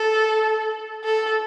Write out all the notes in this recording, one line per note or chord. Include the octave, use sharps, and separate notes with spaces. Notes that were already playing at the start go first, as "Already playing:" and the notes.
Already playing: A4
A4